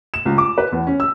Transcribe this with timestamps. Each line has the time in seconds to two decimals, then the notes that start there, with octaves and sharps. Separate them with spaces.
0.14 E7
0.25 C#2
0.38 D6
0.58 B4
0.72 E2
0.87 C#4
1.00 E6